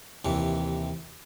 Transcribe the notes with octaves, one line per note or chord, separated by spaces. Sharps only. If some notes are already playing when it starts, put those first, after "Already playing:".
D#2 C3 E3